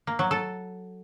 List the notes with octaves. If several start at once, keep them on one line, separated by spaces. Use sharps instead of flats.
A#3
F#3
A4